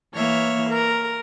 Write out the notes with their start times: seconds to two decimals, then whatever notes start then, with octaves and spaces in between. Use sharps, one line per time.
0.15 E3 A#3 C#5 E5 F6
0.70 A#4